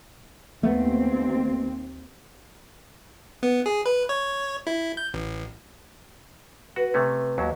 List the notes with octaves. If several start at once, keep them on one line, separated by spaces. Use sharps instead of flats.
D#2 A3 B3 C4
B3
G#4
B4
C#5
E4
G6
A1
F#4 B4
C3 A3 C#4
D#2 F#3